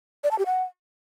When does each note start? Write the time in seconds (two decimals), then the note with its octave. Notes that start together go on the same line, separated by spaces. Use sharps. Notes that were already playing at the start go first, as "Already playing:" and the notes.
0.24 D5
0.31 A5
0.38 G4
0.46 F#5